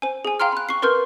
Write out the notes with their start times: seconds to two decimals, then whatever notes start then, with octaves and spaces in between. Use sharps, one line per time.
0.02 C5 G#5
0.25 G#4 G#5
0.40 F5 G5 A#5 C6 F6
0.52 B5 F#6
0.69 C#6 C7
0.82 A#4 B4 C6 F6 G6